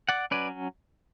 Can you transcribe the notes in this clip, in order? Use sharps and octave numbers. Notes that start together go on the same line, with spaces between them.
D5 F#5
F#3 C#4 B4 D5